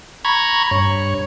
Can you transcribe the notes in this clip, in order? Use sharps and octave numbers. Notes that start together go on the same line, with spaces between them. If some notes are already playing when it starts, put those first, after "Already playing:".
A#5 B5 C#6 G#6
G2 C#5